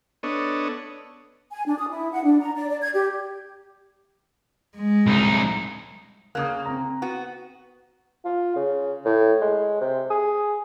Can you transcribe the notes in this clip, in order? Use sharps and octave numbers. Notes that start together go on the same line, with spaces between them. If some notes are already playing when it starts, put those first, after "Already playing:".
B3 D4 A4 C#5 D#5
G#5
D4
D#6
E4
F#5
D4
A#5
D5
D5
G#6
G4
G#3
C2 D#4
C#3 A#3 D#6 F#6
C4 A#5
B3 F#4
F4
C#3
A2
G#3
C3
G#4